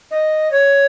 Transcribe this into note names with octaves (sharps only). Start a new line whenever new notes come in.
D#5
C#5